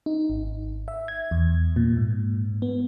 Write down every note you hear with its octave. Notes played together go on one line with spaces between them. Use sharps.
D#4
G#1
E5
G#6
E2
A#2
G#2
B3